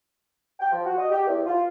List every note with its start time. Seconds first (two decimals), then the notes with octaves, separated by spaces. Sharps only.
0.60 G5
0.72 F3
0.85 F#4
0.98 D#5
1.10 G4
1.27 E2
1.46 F4